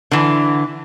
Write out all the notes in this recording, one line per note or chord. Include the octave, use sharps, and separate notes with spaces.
D3 E3